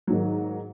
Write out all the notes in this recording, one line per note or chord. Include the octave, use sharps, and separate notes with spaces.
G#2 D#3 F#3